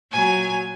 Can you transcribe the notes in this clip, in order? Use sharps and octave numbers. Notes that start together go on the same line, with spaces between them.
A#2 F#3 G#5